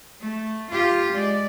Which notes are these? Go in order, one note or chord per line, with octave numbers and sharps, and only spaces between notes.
A3
F4 G4
G#3 D5